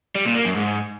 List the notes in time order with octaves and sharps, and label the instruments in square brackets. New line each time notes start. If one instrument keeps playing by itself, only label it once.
[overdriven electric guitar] G3
A#2
A#3
F#2
G#2